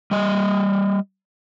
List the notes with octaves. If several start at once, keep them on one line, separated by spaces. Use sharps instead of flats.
G3 D#5